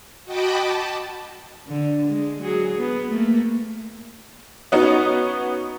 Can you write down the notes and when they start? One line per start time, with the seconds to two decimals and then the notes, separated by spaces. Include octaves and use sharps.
0.25 F#4 D#5 G5 A5 B5 D6
0.62 A5
1.67 D3
2.08 G#3
2.42 F#3 G#4
2.79 B3
3.11 A3 A#3
4.72 B3 C#4 D#4 F#4